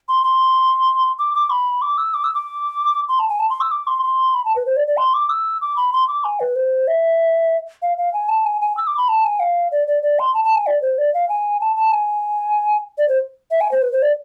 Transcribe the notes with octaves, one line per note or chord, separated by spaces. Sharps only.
C6
C6
D6
D6
B5
D6
E6
D6
E6
D6
C6
A5
G#5
A5
C6
E6
D6
C6
C6
B5
A5
B4
C5
D5
D5
C6
D6
E6
D6
B5
C6
D6
G#5
B4
C5
E5
F5
F5
G#5
A5
G#5
G#5
E6
D6
B5
A5
G#5
F5
D5
D5
D5
C6
A5
A5
G#5
D5
C5
D5
F5
G#5
A5
A5
G#5
D5
C5
E5
G#5
C5
B4
C5
D5